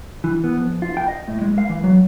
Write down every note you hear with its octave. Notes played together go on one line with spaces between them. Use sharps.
E3
B3
F2
F4
G5
D#5
A2
G#3
F5
E3
F#3